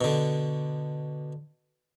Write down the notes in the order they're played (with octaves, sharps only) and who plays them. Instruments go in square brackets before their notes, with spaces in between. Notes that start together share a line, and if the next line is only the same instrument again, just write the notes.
[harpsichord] B2 D3